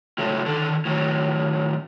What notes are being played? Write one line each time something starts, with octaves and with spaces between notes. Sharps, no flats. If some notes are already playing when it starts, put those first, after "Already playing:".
A2 C#3 F#3 G#3 A3
D3 D#3 A4
A2 D#3 F#3